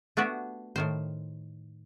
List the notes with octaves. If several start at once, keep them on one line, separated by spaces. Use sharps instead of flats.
A3 B3 D4 F#4 G4
A2 D#3 C5